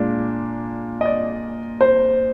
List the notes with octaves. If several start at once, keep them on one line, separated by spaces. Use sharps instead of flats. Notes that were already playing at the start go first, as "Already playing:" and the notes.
Already playing: A#2 G#3 D4 F4
D#5
D5
C5